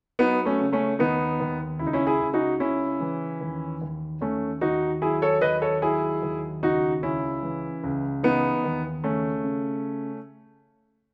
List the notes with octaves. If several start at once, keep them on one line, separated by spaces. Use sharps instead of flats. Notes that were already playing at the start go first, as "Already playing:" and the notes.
F#3 B3 D#4
A3 C#4
C#3
A3 C#4
D#2 B3 D#4
D#2
C#2 E4
D#4
C#4 E4
E4 G#4
C#2
D#4 F#4
C#3 C#4 E4
E3
D#2
D#2
D#2 A3 C#4
D#2 D#4 F#4
F#3 E4 G#4
A4 C#5
D#2 B4 D#5
A4 C#5
F#3 E4 G#4
D#2
C#2 D#4 F#4
C#2 C#4 E4
E3
C#2
E3 B3 D#4
D#2
C#3 A3 C#4
C#3